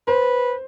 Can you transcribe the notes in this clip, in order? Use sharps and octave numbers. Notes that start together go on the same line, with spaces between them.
B4 C5